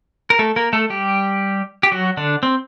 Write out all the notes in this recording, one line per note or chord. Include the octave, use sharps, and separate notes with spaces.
A#4
A3 A4
A#3 A#4
A3 A4
G3 G4
G4
F#3 F#4
D3 D4
C4